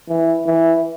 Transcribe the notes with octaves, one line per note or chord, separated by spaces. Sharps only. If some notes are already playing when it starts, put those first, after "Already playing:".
E3
E3